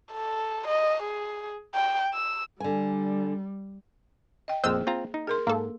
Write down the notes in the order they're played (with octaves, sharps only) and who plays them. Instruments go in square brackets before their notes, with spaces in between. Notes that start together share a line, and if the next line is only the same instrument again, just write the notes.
[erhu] A4
D#5
G#4
G5
E6
[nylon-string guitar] D3 G#5 [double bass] G3
[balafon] D#5 G5
[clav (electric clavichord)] A#1 F2 D#5 [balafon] A#3 G#4 [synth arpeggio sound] C5 E6
[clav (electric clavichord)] C4 F4 A#5
D#4
[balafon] G#4 A#4 C6
[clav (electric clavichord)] G#2 [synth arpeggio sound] A#3 A4